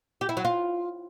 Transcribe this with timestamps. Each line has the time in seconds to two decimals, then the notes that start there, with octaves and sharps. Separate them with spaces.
0.21 G4
0.29 E4
0.37 F#3
0.45 F4